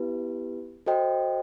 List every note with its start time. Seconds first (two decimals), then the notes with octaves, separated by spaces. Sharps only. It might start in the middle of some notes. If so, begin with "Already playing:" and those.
Already playing: B3 E4 G4 B4
0.86 F#4 A4 C5 D#5 G5